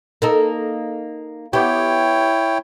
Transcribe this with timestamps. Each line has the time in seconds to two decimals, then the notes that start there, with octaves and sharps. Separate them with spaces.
0.22 A#3 D#4 A4
1.53 B3 E4 G4 C#5 G5